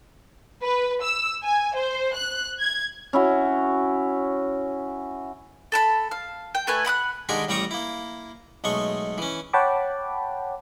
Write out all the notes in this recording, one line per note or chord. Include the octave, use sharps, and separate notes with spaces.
B4
E6
G#5
C5
F#6
G#6
C#4 E4 F#4
A4 A5 B5
F5
G5
A3 B4 G#5
F#5 B5 D6 F#6
D3 D#3 G#3 G4 A#4 G#5
A1 G3 G5 A#5 C#6 D#6
A#3 E4
B1 G#3 A3 C#6
E3 C#4
C#5 F#5 G5 A5 B5 D6